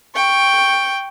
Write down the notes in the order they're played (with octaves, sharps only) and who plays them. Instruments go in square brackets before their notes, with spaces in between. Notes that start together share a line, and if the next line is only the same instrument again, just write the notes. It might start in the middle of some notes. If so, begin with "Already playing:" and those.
[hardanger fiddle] G5 C#6